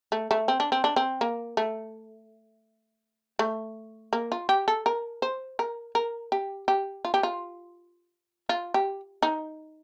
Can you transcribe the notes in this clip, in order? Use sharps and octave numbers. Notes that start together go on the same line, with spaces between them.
A3
A3
C4
D4
C4
D4
C4
A#3
A3
A3
A#3
F4
G4
A4
A#4
C5
A#4
A#4
G4
G4
F4
G4
F4
F4
G4
D#4